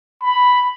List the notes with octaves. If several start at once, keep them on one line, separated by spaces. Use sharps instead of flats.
B5